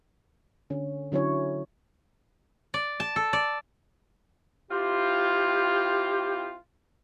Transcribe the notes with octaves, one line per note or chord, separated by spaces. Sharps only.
D3 C#4
D3 F#3 C#4 E4 C#5
D5
A5
A4
D5
C4 E4 F4 G4